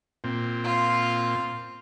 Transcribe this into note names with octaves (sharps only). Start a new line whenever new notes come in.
A#2 C4
F4